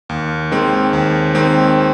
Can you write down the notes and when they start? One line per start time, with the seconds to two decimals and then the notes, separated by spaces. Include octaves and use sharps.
0.09 D#2
0.51 D#3 G#3 C4
0.93 D#2
1.35 D#3 G#3 C4